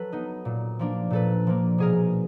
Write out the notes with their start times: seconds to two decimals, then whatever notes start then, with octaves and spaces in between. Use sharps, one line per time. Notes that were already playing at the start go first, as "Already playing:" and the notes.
Already playing: F#3 A4 B4
0.12 B3 D#4
0.45 A#2
0.79 F3 A#3 D4
1.10 A#2 A4 B4
1.47 F3 A#3 D4
1.78 B2 G#4 A#4